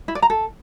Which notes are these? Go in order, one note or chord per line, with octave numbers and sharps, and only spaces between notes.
E4
D5
A#5
A4